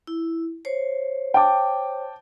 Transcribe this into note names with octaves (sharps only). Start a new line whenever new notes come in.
E4
C5 C#5
G5 A5 D6